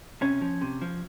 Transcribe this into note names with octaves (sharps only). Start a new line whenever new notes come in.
C3 C#4
F3
C3
F3